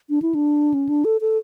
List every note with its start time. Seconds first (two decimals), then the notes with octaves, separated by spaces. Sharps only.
0.10 D4
0.22 E4
0.35 D4
0.74 C#4
0.89 D4
1.05 A4
1.21 A4